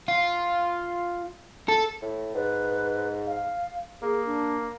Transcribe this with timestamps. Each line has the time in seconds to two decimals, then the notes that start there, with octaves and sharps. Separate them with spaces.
0.08 F4
1.68 A4
2.02 A2
2.35 G#2 B4
3.27 F5
4.02 A#3 G#4
4.26 D4